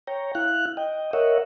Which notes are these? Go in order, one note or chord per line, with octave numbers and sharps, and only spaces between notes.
C#5 G5 A#5
E4 F5 F#6
D#5 G5
A#4 C#5 D#5 E5 F#5